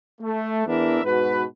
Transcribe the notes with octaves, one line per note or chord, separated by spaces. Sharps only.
A3
E2 E3 B3 D4 A#4 E5
G#2 B2 F#4 B4